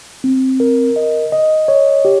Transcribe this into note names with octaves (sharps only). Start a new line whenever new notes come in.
C4
A#4
D#5
D#5
C#5
G4